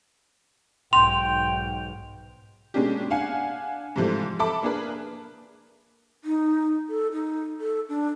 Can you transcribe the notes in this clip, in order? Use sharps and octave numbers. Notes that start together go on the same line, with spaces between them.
B1 G#2 G5 C6 F7
B2 G#3 A#3 C#4 D4 G4
D4 F5 F#5 G#5
G#2 C3 E3 F3 G3 A3
A4 E5 A5 B5 D6
A#3 D4 G#4 A#4 B4
D#4
A4
D#4
A4
D4